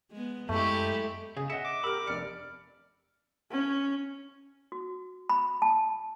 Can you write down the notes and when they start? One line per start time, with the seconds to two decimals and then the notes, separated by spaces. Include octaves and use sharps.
0.11 G#3 B3
0.49 F#2 G#3 A3 E4 G4 A4
1.37 C#3 G#4
1.50 D#5 E5 F#5 C#7
1.65 D6
1.84 G4 A#4 B5 E6 F6
2.07 F1 D5 F6 C#7
3.51 C#4
4.72 F#4
5.29 B5
5.62 A5